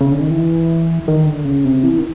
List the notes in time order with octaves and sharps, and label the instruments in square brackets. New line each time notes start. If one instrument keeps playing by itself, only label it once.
[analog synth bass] C#3
D3
D#3
E3
D#3
D3
C#3
C3
E3
D#3